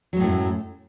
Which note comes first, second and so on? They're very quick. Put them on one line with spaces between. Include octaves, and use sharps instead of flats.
F#3 G#3 A2 F#2